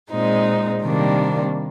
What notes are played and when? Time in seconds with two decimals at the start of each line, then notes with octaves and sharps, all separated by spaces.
0.11 A#2 G#3 C4 D#4
0.83 C3 D#3 G3 A#3 D4